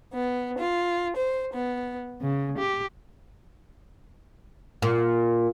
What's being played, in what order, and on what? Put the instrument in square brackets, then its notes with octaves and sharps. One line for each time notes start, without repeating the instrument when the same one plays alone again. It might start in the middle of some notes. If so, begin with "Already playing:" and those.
[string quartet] B3
F4
C5
B3
C#3
G4
[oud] A#2